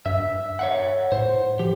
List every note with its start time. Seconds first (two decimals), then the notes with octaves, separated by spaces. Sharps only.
0.06 G2 E5
0.59 C#5 E5 F#5
1.12 A2 C5
1.59 F3 G4